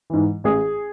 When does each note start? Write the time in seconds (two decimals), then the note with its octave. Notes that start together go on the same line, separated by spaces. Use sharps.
0.10 G#2 E3
0.44 A1 G#4